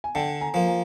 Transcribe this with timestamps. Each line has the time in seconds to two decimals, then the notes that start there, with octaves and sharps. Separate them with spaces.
0.04 G#5
0.15 D3 G5 A5
0.41 G#5 A#5
0.54 F3 A#3
0.67 G#5 A#5